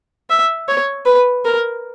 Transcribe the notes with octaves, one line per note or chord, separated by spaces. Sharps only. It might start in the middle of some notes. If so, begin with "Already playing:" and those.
E5
C#5
B4
A#4